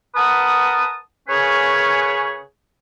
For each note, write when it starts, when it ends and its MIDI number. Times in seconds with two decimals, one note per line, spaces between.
0.15 0.96 70
0.15 0.96 71
0.15 0.96 78
0.15 0.96 81
0.15 0.96 87
1.28 2.39 49
1.28 2.39 61
1.28 2.39 68
1.28 2.39 70
1.28 2.39 71
1.28 2.39 73